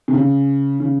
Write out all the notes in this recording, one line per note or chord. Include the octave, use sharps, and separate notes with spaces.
C3
C#3
C#3